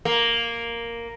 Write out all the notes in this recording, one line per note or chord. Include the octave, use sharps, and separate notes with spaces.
A#3